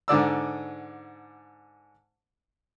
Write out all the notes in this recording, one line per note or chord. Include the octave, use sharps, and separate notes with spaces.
G#2 D3 D5 E6